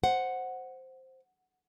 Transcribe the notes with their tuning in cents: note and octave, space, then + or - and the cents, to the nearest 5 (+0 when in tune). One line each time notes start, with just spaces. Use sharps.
C5 +0 F#5 +0